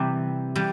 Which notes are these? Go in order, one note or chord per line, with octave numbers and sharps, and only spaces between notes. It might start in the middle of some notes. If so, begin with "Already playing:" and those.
Already playing: C3 E3 G3
E3 G3